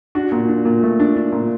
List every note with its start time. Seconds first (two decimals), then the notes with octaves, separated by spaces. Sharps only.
0.15 D4 F#4
0.32 A#2
0.48 D4
0.65 A#2
0.83 A3
1.00 D4
1.16 D4
1.32 A#2